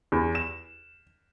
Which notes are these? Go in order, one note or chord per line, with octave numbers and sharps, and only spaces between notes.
E2
E7